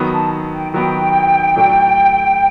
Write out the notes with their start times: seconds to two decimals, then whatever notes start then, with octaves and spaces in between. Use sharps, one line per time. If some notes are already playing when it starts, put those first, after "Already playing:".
Already playing: D#3 F#3 B3
0.13 A5
0.53 G5
0.74 D#3 F#3 B3 G5
1.56 A2 F#3 A3 D4